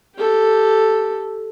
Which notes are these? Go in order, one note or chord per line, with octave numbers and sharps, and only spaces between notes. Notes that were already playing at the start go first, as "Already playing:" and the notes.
G4 A4